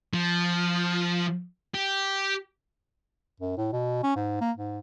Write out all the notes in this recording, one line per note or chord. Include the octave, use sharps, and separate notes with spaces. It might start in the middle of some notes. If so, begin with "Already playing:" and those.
F3
G4
F#2
A2
B2
C#4
G#2
A#3
G#2